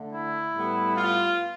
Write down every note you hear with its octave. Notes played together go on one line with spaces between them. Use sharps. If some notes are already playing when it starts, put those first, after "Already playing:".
Already playing: D3 A3
E4
A2 G3 B3
F4